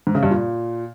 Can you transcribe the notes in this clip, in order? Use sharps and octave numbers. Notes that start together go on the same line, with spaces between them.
G#2
C#3
G2
A#2